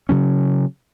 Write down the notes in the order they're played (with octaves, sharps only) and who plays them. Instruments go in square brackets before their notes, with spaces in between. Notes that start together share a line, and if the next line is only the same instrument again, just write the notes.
[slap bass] C#3 F#3 C#4